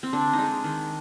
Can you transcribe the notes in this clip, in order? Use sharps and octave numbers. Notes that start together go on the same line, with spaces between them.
C4
D3 D4
D#4
G#3 D4
D#3